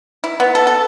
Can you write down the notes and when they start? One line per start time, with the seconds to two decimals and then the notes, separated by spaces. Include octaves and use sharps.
0.24 E4
0.40 B3
0.55 A4
0.67 A4